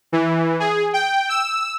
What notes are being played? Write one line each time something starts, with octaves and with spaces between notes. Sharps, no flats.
E3
G#4
G5
E6